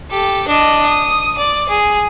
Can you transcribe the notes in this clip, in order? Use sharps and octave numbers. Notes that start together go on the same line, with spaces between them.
G4 A4
D4 D#5
D#6
D5
G#4